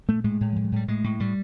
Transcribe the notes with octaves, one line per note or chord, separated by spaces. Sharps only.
A#2 A3
A2 G#3
A2
A2 F3
F#3
A2 G3
A2 G#3
A2
A2 G3